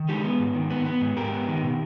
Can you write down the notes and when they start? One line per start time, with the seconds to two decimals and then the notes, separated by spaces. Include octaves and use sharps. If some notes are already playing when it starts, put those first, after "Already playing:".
Already playing: D#3
0.09 G#3 D#4 G4
0.24 B3
0.40 G#2
0.55 D#3
0.71 B3
0.86 B3
1.01 G#2
1.17 G#2 G4 A#4
1.32 B3
1.48 D#3
1.63 B2